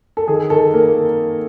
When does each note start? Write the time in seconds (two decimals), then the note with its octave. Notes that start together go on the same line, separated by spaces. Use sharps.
0.17 A4
0.28 D#3 G#4
0.50 D#3 A4
0.74 A#3 A#4